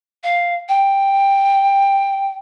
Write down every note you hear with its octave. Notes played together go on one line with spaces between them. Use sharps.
F5
G5